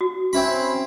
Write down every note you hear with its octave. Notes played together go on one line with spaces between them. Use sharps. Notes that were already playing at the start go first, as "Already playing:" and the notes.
F#4
C4 C#4 E4 B5